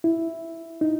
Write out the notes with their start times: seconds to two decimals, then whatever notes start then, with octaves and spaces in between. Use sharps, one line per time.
0.04 E4
0.81 D#4